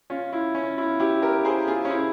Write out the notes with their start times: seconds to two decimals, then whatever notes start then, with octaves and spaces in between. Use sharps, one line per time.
0.10 C#4 F4
0.33 E4
0.55 C#4
0.78 E4
1.00 E4 G4
1.22 G4 A#4
1.45 G#4 C5
1.68 F4 G#4
1.85 C#4
1.90 E4